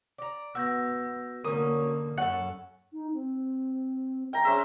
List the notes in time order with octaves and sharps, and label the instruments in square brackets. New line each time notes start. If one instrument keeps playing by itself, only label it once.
[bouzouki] D5 A#5
[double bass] B3 [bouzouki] F#4 [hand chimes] E6 G6 A#6
[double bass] D3 A#3 [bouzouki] F#3 C#4 [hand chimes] A#4 [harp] D#6
[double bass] F#2 [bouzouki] C#4 A4 [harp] F#5
[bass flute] D#4
C4
[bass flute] E5 [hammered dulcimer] G5 A#5
[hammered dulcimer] C#4 C5 E5 [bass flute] G#4